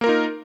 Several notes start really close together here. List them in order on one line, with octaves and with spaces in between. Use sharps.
A#3 A#4 F4 D#4